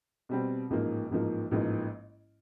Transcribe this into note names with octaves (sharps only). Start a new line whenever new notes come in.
B2 G3 C4
A1 G#2 F3 A#3
A1 G#2 F3 A#3
A1 G#2 F3 A#3